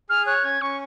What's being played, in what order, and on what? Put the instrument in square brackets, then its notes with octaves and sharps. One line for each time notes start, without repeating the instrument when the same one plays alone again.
[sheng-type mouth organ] G#4 [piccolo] F6
[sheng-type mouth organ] C#5 [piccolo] F#6
[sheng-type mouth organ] C#4 [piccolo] G#6
[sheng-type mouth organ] C#4 [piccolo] C#6